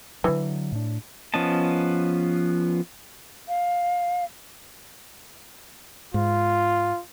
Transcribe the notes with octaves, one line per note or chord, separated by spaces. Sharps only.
D3 E3 F#3
A2 D4
F3 B3 C#4 D#5 A5
F5
G#2 F4